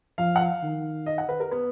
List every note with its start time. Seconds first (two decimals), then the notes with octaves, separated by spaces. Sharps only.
0.18 F3 F5
0.36 F#5
0.41 F5
0.63 D#3
1.06 D#5
1.18 F#5
1.29 B4
1.40 A#4
1.51 B3